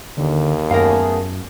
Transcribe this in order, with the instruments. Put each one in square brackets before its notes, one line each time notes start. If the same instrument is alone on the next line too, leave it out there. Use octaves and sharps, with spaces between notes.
[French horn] D#2 [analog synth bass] D3
[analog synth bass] F#2 [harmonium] A3 B3 G#4 [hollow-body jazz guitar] A#4 F5